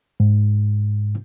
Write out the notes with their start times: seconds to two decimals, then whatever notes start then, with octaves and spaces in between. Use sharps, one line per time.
0.20 G#2